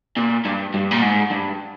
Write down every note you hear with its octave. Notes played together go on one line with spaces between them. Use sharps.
A#2
G2
G2
A#2
G#2
G2